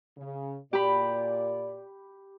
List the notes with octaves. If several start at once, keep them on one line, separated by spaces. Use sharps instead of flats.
C#3
A#2 G4 D5 B5